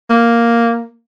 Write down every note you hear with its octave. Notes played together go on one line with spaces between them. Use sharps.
A#3